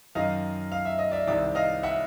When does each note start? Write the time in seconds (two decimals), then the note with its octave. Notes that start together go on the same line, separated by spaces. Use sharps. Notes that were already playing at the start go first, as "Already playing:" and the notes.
0.15 F#2 D#3 D#5 F5
0.72 F5
0.85 E5
0.98 D#5
1.11 D5 E5
1.27 C2 C3 D#3 D5 E5
1.55 D#5 F5
1.83 E5 F#5